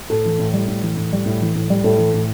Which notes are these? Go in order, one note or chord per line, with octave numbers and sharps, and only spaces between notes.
A2 A4
E3
A2
G3
A2
E3
A2
G3
A2
E3
A2
G3
A2 A4
E3
A2